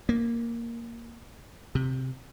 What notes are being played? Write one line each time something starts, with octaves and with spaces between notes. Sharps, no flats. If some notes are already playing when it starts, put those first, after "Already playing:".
A#3
C3